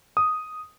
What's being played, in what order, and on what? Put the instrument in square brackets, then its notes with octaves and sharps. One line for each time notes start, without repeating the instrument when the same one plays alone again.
[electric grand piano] D#6